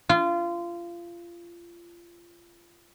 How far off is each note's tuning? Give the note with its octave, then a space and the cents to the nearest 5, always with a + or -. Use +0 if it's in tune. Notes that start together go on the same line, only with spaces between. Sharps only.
F4 -25